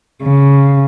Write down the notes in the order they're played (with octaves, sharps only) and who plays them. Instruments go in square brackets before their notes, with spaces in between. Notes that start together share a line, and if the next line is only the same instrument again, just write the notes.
[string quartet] C#3